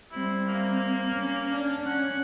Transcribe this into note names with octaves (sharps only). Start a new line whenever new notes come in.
G3 C4 E4
A#3
C#4
C#4 D4
C#4 F#5